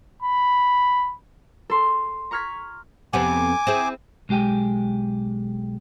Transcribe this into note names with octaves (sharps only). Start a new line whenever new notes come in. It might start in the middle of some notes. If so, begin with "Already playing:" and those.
B5
A4 C6
A#5 C#6 F6 G#6 B6
F2 C3 B3 G#5 D6
C4 E4 G#4
B1 G#3 G4 G5 G#5